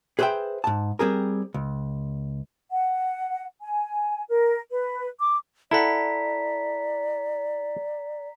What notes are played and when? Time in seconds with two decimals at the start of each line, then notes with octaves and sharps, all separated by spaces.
0.19 G#4 B4 C5 D5 E5 G5
0.64 G#2 A5
0.99 G3 C4 G#4 A#4
1.54 C#2
2.70 F#5
3.61 G#5
4.29 A#4
4.71 B4
5.19 D6
5.71 E4 A4 D5 F#5 A#5 B6